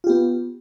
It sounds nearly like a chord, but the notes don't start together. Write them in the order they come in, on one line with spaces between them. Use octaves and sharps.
F4 G4 B3